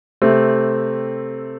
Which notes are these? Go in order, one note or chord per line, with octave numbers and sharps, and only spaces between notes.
C3 A3 C4